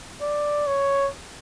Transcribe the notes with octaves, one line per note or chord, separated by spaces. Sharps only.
D5
C#5